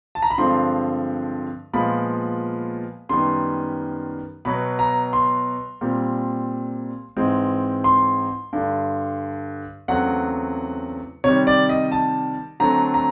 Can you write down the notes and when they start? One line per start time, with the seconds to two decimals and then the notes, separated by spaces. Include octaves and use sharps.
0.15 A5
0.22 A#5
0.30 B5
0.38 G2 D3 F3 G#3 C4 C6
1.73 A#2 F3 G#3 B3 B5
3.09 F#2 D#3 G3 B3 C6
4.45 B2 F#3 B3 B5
4.79 A#5
5.13 C6
5.81 A#2 G3 C4
7.16 G#2 E3 G#3 C4
7.84 C6
8.53 G2 D3 G3
9.88 E2 C#3 F#3 A3 C4 F#5
11.24 C3 D#3 G3 C#5
11.47 D5
11.69 D#5
11.92 A5
12.60 D3 F#3 A3 C4 A#5
12.94 A#5